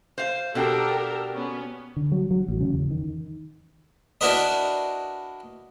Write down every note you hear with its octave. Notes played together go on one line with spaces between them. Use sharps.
C5 F5
B2 D4 G4 A4 A#4 G5
B3 C#4
D3
F#3
F#3
A1
C#3
E2
D#3
D4 E4 F#4 A#4 B4 D#5